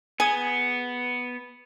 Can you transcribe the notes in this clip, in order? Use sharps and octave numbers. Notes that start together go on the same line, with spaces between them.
B3 G#4 F#5 G#5